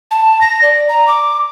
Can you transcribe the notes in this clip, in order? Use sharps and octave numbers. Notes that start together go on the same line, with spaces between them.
A5
A#6
D5
A#5
D6